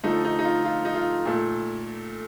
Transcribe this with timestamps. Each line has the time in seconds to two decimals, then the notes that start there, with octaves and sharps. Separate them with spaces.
0.03 D3 F3 A3 D#4
0.25 D#4
0.39 D#4
0.45 F4
0.64 F4
0.85 D#4
0.95 F4
1.25 A#2 A3